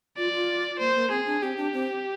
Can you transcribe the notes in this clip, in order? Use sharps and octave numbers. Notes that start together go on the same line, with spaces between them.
F4 D5
F4
A#3 C5
A#3
C4 G#4
D4
C4 G4
D4
C4